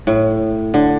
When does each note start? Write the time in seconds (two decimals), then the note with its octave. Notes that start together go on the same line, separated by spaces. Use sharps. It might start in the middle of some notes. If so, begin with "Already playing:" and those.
0.07 A2
0.74 D3